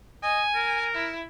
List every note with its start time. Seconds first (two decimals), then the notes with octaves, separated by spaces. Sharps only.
0.23 D#5 G#5
0.55 A#4
0.95 E4